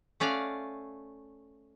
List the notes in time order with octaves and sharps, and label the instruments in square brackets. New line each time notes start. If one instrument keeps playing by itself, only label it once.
[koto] A3 C#4 D5 F5 F#5